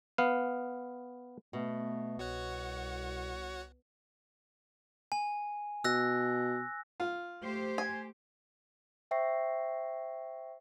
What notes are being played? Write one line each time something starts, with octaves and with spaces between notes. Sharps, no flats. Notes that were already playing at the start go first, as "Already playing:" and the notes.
B3 F5
B2 A3
C2 F#4 C#5 F#5
G#5
B2 E6 F#6 A#6
F4
A3 G4 C5
G#5
C5 E5 G5 C#6 A#6 C7